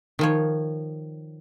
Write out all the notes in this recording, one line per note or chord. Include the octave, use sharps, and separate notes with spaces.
D#3 F3 C#5